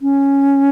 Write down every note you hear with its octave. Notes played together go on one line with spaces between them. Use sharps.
C#4